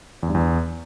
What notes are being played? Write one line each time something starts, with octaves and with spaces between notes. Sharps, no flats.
E2
G2
E2